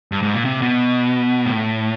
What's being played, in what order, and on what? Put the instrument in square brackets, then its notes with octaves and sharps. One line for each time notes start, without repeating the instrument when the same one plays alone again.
[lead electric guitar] G2
G#2
A#2
C3
B2
A2